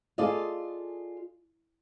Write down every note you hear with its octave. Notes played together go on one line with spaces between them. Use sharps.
F4 G#4 A4 D5 D#5 F5